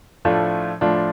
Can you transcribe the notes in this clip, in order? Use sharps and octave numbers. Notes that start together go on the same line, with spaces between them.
A2 F3 A3 D4 F4
A2 F3 A3 D4 F4